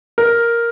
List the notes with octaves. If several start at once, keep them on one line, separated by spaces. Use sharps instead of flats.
A#4